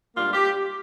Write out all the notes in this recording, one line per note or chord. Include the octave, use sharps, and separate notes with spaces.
G#2 G3 A#3 D4 F4
G4